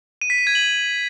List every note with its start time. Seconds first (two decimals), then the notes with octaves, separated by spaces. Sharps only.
0.22 D#7
0.30 B6
0.38 D#7
0.47 G#6
0.55 F#7